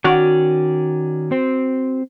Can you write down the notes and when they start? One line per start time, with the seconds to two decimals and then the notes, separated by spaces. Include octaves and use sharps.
0.04 D#3 C#4 F#4 D5
1.31 C4 C5